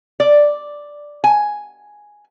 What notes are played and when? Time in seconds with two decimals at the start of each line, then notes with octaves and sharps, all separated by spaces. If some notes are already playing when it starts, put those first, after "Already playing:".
0.20 D5
1.24 G#5